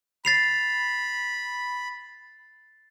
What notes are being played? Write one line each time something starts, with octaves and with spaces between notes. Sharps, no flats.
B5 A6 C7 F7